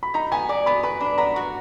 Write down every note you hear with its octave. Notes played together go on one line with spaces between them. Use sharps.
B5
D#4 A#5
B3 G#5
D5
B3 B5
B4 B5
D4
B3 A#5
F#4